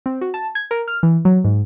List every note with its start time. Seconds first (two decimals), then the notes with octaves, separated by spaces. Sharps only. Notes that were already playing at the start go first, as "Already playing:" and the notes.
0.06 C4
0.21 F#4
0.34 A5
0.55 G#6
0.71 A#4
0.88 F6
1.03 E3
1.25 F#3
1.44 G#2